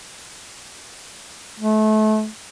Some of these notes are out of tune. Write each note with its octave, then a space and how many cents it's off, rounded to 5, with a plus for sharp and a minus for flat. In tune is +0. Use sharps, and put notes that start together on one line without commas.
A3 -30